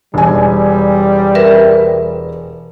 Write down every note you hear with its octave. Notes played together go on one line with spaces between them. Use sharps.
E1 G3 G#5
A#4 B4 E5